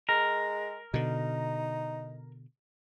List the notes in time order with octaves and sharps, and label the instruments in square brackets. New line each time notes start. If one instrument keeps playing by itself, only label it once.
[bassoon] G#3 [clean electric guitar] A#4
[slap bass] B2 D3 [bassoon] D#4